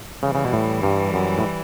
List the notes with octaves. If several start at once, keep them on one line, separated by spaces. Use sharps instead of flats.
C#3 E3 G3
C#3
B2
A2
G2
F#2
A2